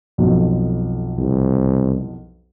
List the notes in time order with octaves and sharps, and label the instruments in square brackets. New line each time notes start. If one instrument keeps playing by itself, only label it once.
[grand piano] B1 F2
[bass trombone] C2